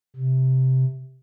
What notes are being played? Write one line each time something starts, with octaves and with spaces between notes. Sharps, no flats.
C3